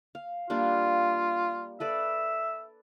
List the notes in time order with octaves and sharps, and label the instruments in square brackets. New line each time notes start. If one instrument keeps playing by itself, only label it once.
[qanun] F5
[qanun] G3 A#3 D4 [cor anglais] F4
[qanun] A4 B4 D5 [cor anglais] E5